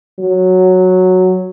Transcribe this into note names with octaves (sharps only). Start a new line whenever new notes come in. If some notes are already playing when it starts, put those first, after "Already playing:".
F#3